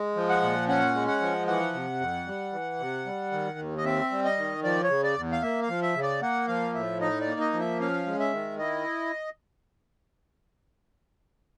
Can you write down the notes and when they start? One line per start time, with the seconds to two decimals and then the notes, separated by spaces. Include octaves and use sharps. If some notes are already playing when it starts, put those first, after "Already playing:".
Already playing: G#3
0.16 F3
0.29 F#5
0.42 A#2
0.68 C#4 F#5
0.94 G#3
1.08 F#5
1.21 F3
1.47 E3 F#5
1.74 C3
2.00 F2
2.27 G3
2.53 E3
2.80 C3
3.06 G3
3.32 D#3
3.58 D#2
3.78 D#5
3.85 C4 E5
4.11 G3
4.25 D#5
4.38 D#3
4.63 F3 D5
4.84 C#5
4.90 C#3
5.03 D5
5.17 E2
5.32 F5
5.42 A#3 E5
5.62 F5
5.69 F3
5.82 E5
5.95 C#3
6.03 D5
6.22 A#3 F#5
6.48 F3 F5
6.74 A2 E5
7.01 D#4 D#5
7.21 D5
7.27 A#3
7.40 D#5
7.54 F3
7.60 E5
7.80 C#4 F5
8.07 G#3
8.20 E5
8.32 D#3
8.58 E4 D#5